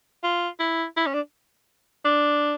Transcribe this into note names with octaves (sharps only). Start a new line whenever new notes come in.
F4
E4
E4
C#4
D4
D4